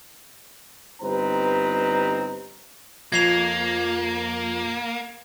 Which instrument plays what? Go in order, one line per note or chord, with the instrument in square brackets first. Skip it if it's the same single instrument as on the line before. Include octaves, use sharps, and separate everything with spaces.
[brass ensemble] G1 G3 C4 D#4 B4 A#5
[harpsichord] F2 [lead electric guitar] A#3 [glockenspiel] G#6 C7 F7